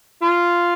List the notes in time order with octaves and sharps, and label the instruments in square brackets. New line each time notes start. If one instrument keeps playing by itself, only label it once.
[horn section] F4